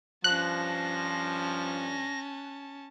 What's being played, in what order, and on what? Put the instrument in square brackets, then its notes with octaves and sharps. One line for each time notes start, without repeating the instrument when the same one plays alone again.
[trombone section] G2 F3 [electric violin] C#4 A5 [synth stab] F#6 [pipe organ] A#6